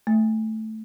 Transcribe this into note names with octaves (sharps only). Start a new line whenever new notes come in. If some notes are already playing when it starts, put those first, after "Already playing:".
A3